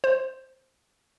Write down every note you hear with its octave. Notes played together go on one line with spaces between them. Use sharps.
C5